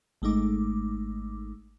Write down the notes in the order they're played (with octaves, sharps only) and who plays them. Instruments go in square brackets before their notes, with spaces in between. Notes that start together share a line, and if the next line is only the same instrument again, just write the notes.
[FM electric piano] G#1 G#3 A3 D#4 D6